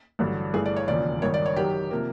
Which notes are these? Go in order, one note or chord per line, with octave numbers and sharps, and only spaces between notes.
A1 G2 D3 F#3
G1 G2 E3 A3 G#4
D5
C#5
E1 D#2 C#3 F3 D5
G#1 G2 D#3 C#5
D5
C#5
F#2 D#3 F#3 G4
C3 F3 A#3